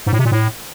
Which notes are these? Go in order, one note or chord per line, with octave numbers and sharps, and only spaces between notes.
G#2
A2
C3
A#2
A2